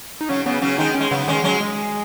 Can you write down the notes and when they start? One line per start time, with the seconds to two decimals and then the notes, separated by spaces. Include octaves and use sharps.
0.21 D#4
0.29 C#3 F#3 C#4
0.46 C#3 F#3 B3
0.62 C#3 F#3 C#4
0.78 D#3 G#3 D#4
0.95 C#4
1.00 G#3
1.11 C#3 F#3 B3
1.27 D#3 G#3 C#4
1.44 F#3 G#3 C#4
1.60 G#3